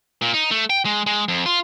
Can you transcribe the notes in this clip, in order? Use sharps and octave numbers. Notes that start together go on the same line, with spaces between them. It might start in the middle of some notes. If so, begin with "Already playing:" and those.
A#2
D#4
A3
G5
G#3
G#3
F2
F4